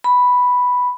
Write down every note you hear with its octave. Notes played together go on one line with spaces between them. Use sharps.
B5